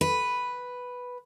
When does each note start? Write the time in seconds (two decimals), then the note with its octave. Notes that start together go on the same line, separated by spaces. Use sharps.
0.01 B4